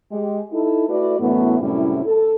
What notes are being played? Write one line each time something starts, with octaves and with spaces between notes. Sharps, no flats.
G#3 G4
D#4 E4 A4
A3 E4 F#4 B4 D5
F#2 A2 E3 A3 B3
F#2 A2 C3 G3 C#4 E4
A4